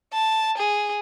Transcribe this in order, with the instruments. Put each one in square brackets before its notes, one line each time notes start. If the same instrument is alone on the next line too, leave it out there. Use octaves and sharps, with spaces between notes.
[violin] A5
G#4